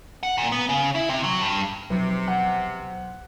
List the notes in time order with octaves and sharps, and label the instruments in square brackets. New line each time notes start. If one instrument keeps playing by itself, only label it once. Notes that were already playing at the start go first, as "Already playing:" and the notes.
[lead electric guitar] F#5
A#2
B3
C#3
E4
C3
F#3
G2
[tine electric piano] B1 [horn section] C3 [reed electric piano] F3 F#3 B4
[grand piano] F#5